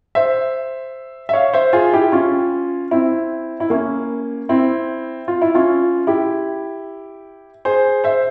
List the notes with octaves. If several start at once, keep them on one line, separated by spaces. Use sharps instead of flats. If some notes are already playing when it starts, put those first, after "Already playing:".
C5 E5
E5
C#5 F5
C5 E5
F4 G#4
E4 G4
C#4 F4
C4 E4
E4
A#3 C#4
C4 E4
F4
E4
C#4 F4
E4 G4
G#4 C5
C5 E5